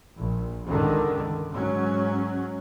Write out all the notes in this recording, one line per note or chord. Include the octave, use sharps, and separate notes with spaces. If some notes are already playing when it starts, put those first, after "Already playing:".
A#1
C#2 G2 D3 D#3
G#2 F#3 C#4